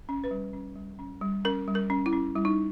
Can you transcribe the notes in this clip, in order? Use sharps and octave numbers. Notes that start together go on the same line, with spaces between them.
C#4
B4
G3
C#4
G3
C#4
G3
C#4 A#4
G3
A#4
C#4
E4
C#4
G3 E4
D#4